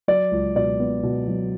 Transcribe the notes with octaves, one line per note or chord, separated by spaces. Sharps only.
F#3 D5
C#2
B2 D5
B3
B2
F#3